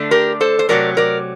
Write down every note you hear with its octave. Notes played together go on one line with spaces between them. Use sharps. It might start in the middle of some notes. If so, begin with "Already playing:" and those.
Already playing: D3 A3 D4
G4 A#4
A4 C5
C5
C3 F#3 A3 A#4 D5
A#4 D5